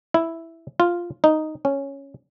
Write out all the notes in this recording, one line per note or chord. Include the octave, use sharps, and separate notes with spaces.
E4
F4
D#4
C#4